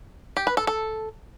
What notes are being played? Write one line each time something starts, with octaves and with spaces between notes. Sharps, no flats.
G4
B4
A4
A4